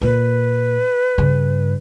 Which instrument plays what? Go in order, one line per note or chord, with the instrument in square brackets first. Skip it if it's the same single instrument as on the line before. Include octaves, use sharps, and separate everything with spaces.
[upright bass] A#2 A#3 [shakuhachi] B4
[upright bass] G2 C#3